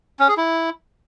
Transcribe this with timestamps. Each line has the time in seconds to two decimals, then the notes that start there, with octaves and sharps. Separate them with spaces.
0.20 C#4
0.29 G#4
0.37 E4